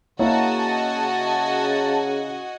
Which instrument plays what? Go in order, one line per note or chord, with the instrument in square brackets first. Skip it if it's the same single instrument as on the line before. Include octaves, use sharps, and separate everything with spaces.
[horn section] C#3 [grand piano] A#3 E4 C#5 [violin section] F#4 D#5 G#5 [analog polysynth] A5